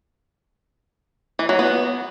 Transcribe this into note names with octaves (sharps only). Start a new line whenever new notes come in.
E3
F#3
B3